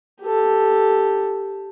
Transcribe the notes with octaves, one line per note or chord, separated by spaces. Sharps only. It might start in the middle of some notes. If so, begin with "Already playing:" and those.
G4 A4